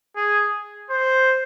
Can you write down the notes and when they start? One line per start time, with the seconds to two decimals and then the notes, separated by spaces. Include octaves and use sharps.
0.16 G#4
0.90 C5